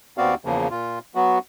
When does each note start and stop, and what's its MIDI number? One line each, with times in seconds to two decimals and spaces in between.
0.18 0.35 39
0.18 0.35 59
0.18 0.35 60
0.18 0.35 66
0.18 0.35 74
0.18 0.35 77
0.45 0.68 40
0.45 0.68 49
0.45 0.68 53
0.45 0.68 58
0.70 0.99 46
0.70 0.99 65
1.15 1.39 54
1.15 1.39 59
1.15 1.39 66